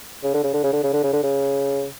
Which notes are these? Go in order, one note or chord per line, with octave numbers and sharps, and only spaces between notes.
C#3
D3
C#3
D3
C#3
D3
C#3
D3
C#3
D3
C#3